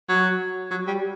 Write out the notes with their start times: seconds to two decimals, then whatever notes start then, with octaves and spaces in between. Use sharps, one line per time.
0.09 F#3
0.71 F#3
0.87 G3